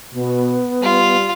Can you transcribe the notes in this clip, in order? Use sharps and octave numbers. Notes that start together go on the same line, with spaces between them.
B2 B3
G3 F4